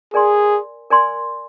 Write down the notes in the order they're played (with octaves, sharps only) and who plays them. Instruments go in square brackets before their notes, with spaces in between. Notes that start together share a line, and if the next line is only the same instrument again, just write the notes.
[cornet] G#4 [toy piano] A#4 D5 G#5 C6
[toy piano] A#4 D5 G#5 C6